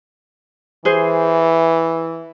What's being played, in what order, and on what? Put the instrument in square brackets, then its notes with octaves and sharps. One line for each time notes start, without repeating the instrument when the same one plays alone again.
[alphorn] E3 [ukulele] G#4 C5